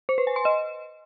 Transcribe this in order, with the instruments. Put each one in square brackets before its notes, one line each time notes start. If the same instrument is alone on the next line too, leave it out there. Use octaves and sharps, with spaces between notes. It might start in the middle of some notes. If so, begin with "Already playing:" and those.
[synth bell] C5
B4
G#5
C6
D#5